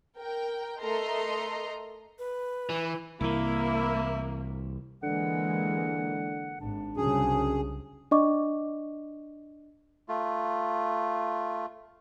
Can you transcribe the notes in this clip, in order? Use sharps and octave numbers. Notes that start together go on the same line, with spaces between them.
A#4 G5
A3 A4 A#4 D#5 A#5 C6
B4
E3
C2 E3 A#3 E4
D3 E3 G#3 A#3 F#5
G#1 D4
C2 F#2 C#3 G#4
D4 D5 D#5 C#6 D6
A3 F4